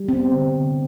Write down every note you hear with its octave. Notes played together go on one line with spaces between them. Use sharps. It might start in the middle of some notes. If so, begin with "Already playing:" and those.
Already playing: G3
B3 C4
D3
D3